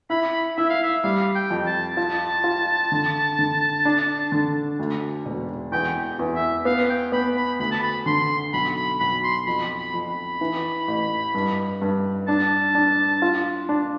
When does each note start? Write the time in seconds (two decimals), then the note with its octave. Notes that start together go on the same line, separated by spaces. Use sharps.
0.10 E4 B5
0.57 E4 E5
0.70 F5
0.83 E5
1.03 G3 F5
1.35 G5
1.50 F2
1.66 A5
1.97 F4 A5
2.44 F4
2.92 D3
3.39 D3
3.85 D4
4.32 D3
4.79 D2
5.25 E1
5.72 E2 G5
6.19 E2
6.35 E5
6.65 B3 F5
6.89 G5
7.12 B3 B5
7.36 B5
7.59 D2 B5
7.72 A5
7.83 B5
8.06 D3 C6
8.53 B1 B5
8.76 B5
9.00 B1 B5
9.24 C6
9.46 F2 B5
9.78 B5
9.94 F2
10.09 B5
10.41 E3
10.88 A1
11.34 G2
11.82 G2
12.28 D4 A5
12.75 D4
13.22 F4
13.69 D4